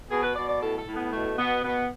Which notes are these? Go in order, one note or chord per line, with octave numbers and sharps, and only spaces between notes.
B2 G#4
B4
B2 D5
D5
A2 A4
A4
A2
B3
B2 A3
B2 B3
B2 B3